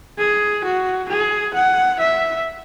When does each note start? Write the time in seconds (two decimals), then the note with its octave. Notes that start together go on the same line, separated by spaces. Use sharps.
0.18 G#4
0.64 F#4
1.09 G#4
1.53 F#5
1.99 E5